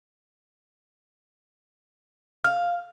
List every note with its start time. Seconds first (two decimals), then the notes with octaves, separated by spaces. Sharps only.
2.44 F5 F6